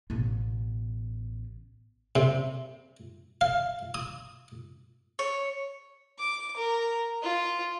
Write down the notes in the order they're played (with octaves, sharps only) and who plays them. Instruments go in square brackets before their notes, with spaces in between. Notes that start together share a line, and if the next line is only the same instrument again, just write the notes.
[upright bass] A1 B2
[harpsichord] C3
F5
D#6
[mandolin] C#5
[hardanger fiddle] D6
A#4
F4